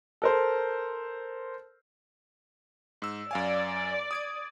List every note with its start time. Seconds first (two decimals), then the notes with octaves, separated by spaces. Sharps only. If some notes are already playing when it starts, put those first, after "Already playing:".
0.22 A4 A#4 C5
3.02 G#2 E6
3.31 F#2 D5 F5 G#5
4.11 D#6 G#6 D7